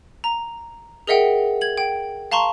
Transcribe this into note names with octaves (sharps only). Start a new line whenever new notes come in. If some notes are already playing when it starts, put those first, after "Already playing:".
A#5
G#4 A#4 D#5 E5 F#5 G5
G#6 F#7
G5
F5 A5 A#5 C6 C#6